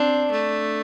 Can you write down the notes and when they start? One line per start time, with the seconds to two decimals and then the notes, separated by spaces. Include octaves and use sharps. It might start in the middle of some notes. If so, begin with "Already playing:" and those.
Already playing: C4 D4
0.31 A3